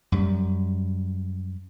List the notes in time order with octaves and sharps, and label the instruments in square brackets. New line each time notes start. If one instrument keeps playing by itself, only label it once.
[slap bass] F#2 G3